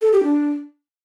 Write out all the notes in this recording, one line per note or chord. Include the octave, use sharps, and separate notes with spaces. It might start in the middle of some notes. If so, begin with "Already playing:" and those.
A4
G4
D4